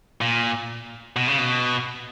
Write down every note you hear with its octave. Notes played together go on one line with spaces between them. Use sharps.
A#2
B2
C#3
B2